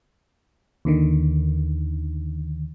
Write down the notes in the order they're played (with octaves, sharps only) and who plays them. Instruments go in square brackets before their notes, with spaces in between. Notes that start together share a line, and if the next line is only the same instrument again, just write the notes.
[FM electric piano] D#2 D3 D#3